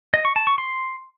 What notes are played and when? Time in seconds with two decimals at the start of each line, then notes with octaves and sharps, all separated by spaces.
0.14 D#5
0.25 C#6
0.36 A5
0.47 C#6
0.58 C6